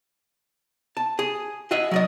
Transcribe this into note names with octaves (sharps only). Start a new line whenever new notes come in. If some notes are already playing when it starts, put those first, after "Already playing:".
A5
G#4
F#4 G#4 D#5 E5 F#5
F#3 D5 D#5